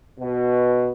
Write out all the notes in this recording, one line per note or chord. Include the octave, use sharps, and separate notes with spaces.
B2